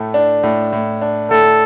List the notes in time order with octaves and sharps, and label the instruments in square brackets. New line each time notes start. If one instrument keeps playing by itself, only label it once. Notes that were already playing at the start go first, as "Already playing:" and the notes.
Already playing: [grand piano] A2 A3
D4
A2
A2
D4
[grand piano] A2 [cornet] A4